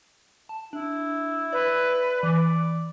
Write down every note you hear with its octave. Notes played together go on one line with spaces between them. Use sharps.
A5
D4 E4
B4 D5
E3 D5